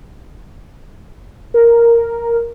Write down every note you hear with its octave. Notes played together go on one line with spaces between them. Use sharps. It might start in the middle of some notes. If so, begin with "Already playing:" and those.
A#4